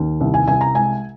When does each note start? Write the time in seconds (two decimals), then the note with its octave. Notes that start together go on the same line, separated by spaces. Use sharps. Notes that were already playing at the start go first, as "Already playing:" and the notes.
Already playing: D#2
0.20 C2
0.34 G#5
0.47 C2 G#5
0.61 A#5
0.75 G#3 G#5